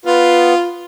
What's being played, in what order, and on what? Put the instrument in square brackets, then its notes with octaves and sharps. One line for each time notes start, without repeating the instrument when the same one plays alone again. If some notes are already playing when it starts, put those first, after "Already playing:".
[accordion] B3 [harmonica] F4